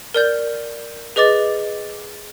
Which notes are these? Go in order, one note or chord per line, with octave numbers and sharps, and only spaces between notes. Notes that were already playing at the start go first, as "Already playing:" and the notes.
A#4 D5 G6
G#4 B4 D#5 D6 A6